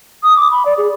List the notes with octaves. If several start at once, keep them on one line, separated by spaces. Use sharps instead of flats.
D#6
D6
B5
D5
G#4